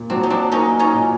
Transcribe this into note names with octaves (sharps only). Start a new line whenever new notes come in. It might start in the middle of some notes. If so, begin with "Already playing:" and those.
Already playing: A#2
F#3 C4 D4
D#4
C4 D4
A#3 C#4 D#4
C#4 D#4
A#2